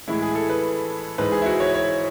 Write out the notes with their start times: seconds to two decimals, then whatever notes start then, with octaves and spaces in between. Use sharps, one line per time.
0.08 A2 E3 G#3 E4
0.22 G#4
0.35 A4
0.50 B4
1.18 G#2 E3 G#3 B4
1.32 G#4
1.42 E4
1.46 F#4
1.60 C#5
1.74 C#5